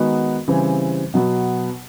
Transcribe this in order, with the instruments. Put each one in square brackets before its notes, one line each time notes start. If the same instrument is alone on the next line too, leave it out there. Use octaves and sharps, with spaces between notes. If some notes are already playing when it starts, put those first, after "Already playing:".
Already playing: [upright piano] D#3 G#3 B3 D#4 F#4
C#3 E3 G3 C4
B2 F#3 B3